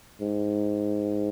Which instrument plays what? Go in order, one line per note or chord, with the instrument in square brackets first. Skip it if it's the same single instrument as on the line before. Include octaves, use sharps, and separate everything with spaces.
[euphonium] G#2